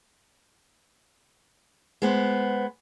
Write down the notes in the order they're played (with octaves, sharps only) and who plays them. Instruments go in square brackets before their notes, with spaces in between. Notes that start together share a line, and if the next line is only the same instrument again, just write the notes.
[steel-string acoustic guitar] G#3 B3 C5